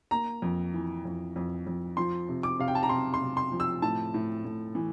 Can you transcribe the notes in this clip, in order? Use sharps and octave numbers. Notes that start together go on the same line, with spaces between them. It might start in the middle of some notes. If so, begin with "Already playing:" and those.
A#3 A#5
F2
E3
F2
F2
F2
F3 C6
C3
D6
C3 F5
G5
A5
A#5
C3 C6
C6
C3
C6
F3
E6
A2 A5
A2
A2
E3